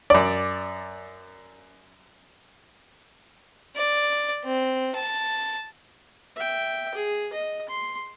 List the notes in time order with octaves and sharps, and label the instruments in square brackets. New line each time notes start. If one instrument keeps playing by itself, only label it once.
[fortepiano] F#2 D5
[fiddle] D5
C4
A5
[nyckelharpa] E5 G5
G#4
D#5
C6